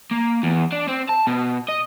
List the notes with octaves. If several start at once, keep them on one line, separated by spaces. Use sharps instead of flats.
A#3
E2
D4
C4
A5
B2
D#5